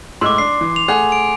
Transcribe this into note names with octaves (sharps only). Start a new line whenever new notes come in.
A2 G#3 C6 D6 E6
D4 C7
E3
F7
A3 G#4 F#5
D7